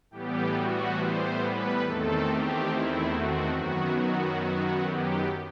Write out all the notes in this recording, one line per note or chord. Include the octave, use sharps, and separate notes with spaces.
A2 E3 G3 B3 G4
F#4
C5
B4
E2 D#3 A3 C4 A4
G4
E4
F#4
F#2 D#3 F#3 B3 F#4
F#4
F#4
G4